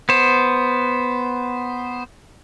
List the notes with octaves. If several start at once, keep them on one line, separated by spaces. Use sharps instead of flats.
B3 C5